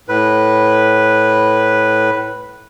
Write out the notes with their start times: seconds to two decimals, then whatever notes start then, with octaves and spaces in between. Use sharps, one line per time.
0.09 A2 B4